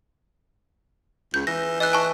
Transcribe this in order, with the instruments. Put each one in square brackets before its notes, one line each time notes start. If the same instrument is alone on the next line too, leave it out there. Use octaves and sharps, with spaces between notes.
[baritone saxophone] C#2 [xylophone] G6
[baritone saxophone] E3 [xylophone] A#6
[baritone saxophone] E3 [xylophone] D#5 F#6
[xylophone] G#5 A5 C#6